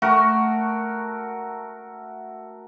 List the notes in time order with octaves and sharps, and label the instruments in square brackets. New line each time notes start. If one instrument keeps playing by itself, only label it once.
[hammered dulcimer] A3 F#4 A#4